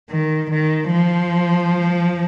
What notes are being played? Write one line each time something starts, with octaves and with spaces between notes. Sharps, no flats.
D#3
D#3
F3